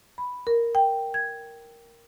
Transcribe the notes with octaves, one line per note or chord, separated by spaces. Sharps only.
B5
A#4
G5
G#6